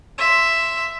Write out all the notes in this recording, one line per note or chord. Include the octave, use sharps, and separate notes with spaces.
E5 C6